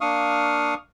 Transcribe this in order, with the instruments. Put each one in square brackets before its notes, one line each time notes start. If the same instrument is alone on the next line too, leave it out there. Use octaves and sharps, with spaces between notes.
[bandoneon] A#3 D4 F5 C#6 D#6 F6